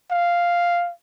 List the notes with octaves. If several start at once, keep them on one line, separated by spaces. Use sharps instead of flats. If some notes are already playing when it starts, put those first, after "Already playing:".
F5